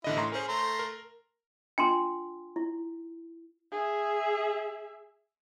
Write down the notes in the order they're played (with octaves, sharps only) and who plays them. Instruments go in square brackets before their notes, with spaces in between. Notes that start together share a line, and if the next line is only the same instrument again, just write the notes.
[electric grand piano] A1 D3 D#5 [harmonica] E4
[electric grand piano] A2 A#5 C6
[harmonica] C#4 G#4 [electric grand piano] A#4 C5
[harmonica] A3 A#5 C6
[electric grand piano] A#4
[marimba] D4 F4 [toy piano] G5 G#5 C6
[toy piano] E4
[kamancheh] G#4 E5